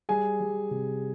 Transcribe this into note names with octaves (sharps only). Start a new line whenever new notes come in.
G3 G#4 G#5
G3
C3